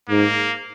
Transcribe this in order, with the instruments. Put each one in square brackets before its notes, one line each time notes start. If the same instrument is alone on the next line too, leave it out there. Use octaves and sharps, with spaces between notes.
[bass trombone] G#2 [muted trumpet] A#3